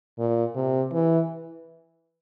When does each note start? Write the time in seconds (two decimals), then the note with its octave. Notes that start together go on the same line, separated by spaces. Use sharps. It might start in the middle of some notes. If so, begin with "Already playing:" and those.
0.19 A#2
0.55 C3
0.93 E3